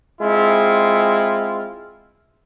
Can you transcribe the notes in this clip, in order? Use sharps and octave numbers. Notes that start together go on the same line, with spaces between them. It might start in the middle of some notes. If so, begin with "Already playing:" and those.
G#3 C4 E4 F4